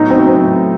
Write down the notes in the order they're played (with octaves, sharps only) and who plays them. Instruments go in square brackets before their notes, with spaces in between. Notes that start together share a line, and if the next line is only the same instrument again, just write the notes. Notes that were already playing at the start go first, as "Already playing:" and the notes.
Already playing: [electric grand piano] A2 F#3 B3 F#4 [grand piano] D#4
[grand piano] C4
[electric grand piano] F#3
[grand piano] C4
[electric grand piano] A2